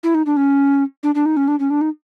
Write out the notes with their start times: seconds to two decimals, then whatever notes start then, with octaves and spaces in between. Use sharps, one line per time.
0.03 E4
0.14 D#4
0.26 D4
0.37 C#4
1.03 D4
1.15 D4
1.26 D#4
1.37 C#4
1.48 D4
1.60 C#4
1.70 D4
1.81 D#4